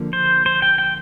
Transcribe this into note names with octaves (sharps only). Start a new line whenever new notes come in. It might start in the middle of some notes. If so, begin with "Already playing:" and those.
Already playing: D3 F3 A#3
C5
C5
G5
G5